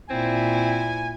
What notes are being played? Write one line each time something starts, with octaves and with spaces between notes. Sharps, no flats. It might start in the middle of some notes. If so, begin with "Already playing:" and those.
A#2 C4 E4 G#5